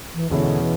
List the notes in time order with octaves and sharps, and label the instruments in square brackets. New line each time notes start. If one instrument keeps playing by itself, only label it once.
[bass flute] E3
[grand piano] E2 B2 G#3 C#4 E4 [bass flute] D3
[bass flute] E3